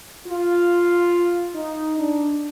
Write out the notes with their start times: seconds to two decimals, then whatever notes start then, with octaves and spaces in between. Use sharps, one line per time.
0.27 F4
1.55 D#4
1.98 D4